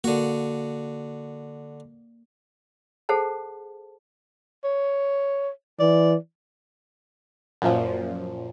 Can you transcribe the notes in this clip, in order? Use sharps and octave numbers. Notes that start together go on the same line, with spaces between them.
D3 A#3 F#4
G#4 A4 C5 F#5 A5
C#5
E3 D5
F#2 A#2 F3